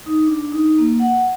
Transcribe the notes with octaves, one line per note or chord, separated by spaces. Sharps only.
D#4
D4
D#4
A#3
F#5